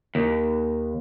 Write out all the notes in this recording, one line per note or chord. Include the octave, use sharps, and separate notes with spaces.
D#2